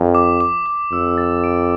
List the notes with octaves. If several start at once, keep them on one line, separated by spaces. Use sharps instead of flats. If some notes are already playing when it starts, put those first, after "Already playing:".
Already playing: F2
D6
D6
D6
F2 E6
A6
D7